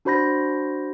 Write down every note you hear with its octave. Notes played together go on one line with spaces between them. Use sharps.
D4 F#4 C5 B5 G6 A#6